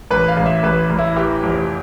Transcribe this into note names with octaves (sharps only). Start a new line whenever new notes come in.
A1 B4
F5
A1
E5
A1 B4
A1
E4
E3 G4
F1